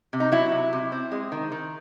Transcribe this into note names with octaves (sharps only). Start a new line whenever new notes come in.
C3
D#4
F#3 E4
C3
C3
C4
G#3
D#3
D#3